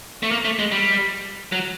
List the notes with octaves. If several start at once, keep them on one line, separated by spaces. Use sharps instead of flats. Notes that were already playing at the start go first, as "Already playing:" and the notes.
A3
A#3
A3
G#3
G3
F#3